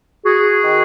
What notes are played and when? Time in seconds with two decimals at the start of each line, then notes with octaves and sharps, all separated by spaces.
0.23 F#4 G#4
0.62 D#3